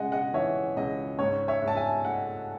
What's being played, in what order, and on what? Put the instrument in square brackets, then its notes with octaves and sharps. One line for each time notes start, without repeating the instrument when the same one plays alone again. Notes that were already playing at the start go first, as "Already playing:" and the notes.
Already playing: [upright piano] C#3 G#3 D#5 F#5 G#5
D#5 F#5
E3 C#5 E5
C#2 D#5
G#2 C#5
C#5 E5
G#2
A5
E5 G#5
A3 D#5 F#5